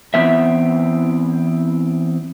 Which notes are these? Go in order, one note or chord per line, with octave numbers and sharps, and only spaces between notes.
E3 B3 C4 E5